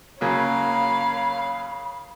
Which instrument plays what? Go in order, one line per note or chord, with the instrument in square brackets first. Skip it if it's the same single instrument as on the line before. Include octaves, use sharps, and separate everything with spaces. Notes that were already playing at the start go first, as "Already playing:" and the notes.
[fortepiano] C#3 F#3 A#3 [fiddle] C#5 F5 [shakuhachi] B5